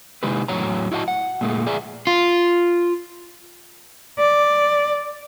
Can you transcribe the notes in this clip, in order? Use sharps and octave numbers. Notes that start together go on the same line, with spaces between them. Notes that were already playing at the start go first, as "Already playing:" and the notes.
C3 G#3 D#4 E4 G4 B4
E2 A2 F#3 C#5 A#5
E4 F#4 D#5 F#5 A5
F#5
A#2 G#3 A3
G#4 D5 E5 A#5
F4
D5